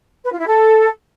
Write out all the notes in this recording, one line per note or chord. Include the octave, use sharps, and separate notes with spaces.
B4
F4
E4
A4